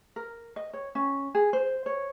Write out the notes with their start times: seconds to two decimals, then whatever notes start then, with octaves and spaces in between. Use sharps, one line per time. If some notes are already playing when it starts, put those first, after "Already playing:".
0.16 A#4
0.56 D#5
0.73 C#5
0.95 C#4
1.35 G#4
1.53 C5
1.86 C#5